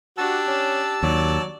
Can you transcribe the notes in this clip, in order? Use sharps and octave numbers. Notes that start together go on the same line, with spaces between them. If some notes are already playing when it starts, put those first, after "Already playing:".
D4 F#4 G4 A5 E6
C#4
D#2 F#3 D5